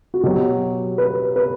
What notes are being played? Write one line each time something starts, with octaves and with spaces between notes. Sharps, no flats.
F#4
B2 F#3 G4
B4
B4